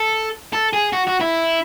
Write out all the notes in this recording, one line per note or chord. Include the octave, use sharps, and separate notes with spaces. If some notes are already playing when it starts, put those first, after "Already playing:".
Already playing: A4
A4
G#4
F#4
F#4
E4